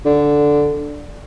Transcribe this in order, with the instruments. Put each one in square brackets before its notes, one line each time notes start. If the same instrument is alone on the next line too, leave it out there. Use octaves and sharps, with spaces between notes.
[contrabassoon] D3